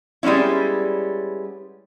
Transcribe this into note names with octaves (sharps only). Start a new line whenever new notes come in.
G3 G#3 B3 C#4 E4